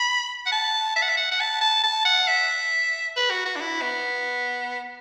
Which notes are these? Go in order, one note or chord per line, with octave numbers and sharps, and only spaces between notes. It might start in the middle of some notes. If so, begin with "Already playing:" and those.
Already playing: B5
F#5
A5
E5
F#5
E5
F#5
F#5
A5
A5
A5
F#5
E5
B4
F#4
F#4
D4
E4
B3